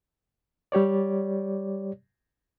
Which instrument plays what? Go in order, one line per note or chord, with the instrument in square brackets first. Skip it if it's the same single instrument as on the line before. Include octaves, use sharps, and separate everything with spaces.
[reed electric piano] G3 G4 C#5 D5